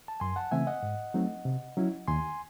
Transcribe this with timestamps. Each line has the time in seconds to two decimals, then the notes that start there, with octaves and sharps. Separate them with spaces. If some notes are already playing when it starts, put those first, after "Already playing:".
0.08 A5
0.20 F#2 G#5 C6
0.36 F#5 A5
0.51 C#3 E3 A3 C4 E5 G#5
0.67 D#5 F#5
0.83 G#2
1.14 F#3 A3 C4 D#4
1.45 C3
1.77 F#3 C#4 E4
2.08 D#2 G#5 C6